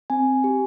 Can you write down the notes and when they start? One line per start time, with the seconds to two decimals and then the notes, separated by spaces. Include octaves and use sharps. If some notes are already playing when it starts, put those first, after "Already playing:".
0.10 C4 G#5
0.44 G4